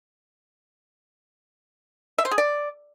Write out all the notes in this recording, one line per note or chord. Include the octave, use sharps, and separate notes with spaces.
E5
C5
G#4
D5